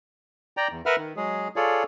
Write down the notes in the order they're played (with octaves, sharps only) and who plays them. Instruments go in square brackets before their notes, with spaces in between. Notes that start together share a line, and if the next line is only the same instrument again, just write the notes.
[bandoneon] D5 G5 A#5
E2
A#4 B4 E5 F#5 B5 F6
D#3
F#3 G#3 G#4
F4 G#4 A4 C#5 D5